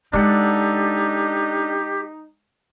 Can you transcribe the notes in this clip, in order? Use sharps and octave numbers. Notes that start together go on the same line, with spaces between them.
G#3 D4 D#4 G4 A4 F#5